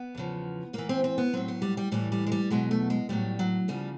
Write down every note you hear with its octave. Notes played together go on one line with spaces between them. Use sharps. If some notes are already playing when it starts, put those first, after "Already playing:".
Already playing: B3
E2 C#3 F3
G#2 E3 A#3
C4
C4
B3
A2 F#3 C4
B3
G3
G3
A2 E3 G3
G3
G#3
G3
E2 B2 F#3 G#3
A3
G#3
A2 F#3 G3
F#3
D2 C#3 F3 G3